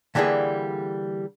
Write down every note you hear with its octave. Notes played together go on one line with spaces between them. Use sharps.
D3 E3 G3 A#3 G#4